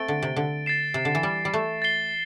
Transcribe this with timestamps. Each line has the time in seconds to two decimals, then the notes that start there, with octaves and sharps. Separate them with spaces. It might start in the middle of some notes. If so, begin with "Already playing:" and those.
Already playing: A3 C4 A6 D7 G7
0.08 D3
0.22 C3
0.36 D3
0.66 A6 C7 E7
0.94 C3
1.05 D3
1.15 E3
1.23 G3
1.45 G3
1.54 A3
1.82 A6 C7 G7